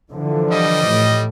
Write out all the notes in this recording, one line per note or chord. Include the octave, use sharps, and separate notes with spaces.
D3 E3 F3
G3 D#5
A2